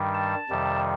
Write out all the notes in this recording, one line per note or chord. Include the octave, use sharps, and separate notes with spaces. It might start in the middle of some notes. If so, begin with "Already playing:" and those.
Already playing: G2 D#3 G3
A5
F2 C3 D#3 G3